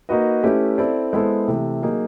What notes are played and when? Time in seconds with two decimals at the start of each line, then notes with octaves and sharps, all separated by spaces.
0.09 A#3 D#4 F#4 B4 D#5
0.43 A3 C#4 E4 G4 B4
0.78 C4 E4 A4 D5
1.13 G#3 B3 E4 A4 C5
1.48 C3 E3 A3
1.82 F#3 A#3 D#4 G#4